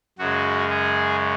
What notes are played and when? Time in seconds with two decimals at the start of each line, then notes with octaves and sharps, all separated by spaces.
0.18 F#2 C#3 G#3 F#4
0.70 G#4